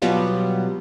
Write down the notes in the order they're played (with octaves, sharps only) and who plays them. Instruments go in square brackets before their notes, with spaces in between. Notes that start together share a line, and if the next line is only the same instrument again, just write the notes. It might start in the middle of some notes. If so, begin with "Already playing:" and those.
[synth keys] B2 F#3 G3 B3 F4